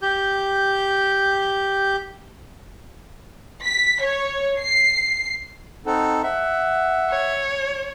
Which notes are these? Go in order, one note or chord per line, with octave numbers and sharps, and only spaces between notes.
G4 G6
B6
C#5
C7
C4 D#4 A4 F#5
E5 F#5
C#5